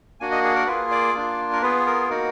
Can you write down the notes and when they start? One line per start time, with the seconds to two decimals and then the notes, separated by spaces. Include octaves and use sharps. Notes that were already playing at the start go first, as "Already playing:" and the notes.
0.20 A#3 D4 F#4 G#5
0.32 D#5
0.44 G#4
0.55 A#4
0.67 A#3 F4 G#4 B4
0.91 D5
1.14 A#3 D4 F4
1.53 A#4
1.62 B3 F4 G#4 B4
1.86 A#4
2.09 A#3 D#4 F#4 A#4